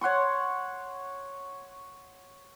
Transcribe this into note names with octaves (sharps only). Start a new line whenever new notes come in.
C#5 F#5 C6 C#6